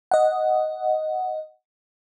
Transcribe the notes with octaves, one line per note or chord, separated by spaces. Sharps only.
D#5 F#5